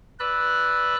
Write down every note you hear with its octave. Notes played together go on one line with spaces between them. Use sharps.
B4 D5 B5 E6 F#6